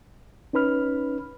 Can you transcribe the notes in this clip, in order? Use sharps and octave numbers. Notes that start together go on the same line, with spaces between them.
C#4 D#4 B4 B5 F6